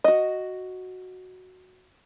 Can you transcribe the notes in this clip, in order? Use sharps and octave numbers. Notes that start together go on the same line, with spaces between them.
F#4 D#5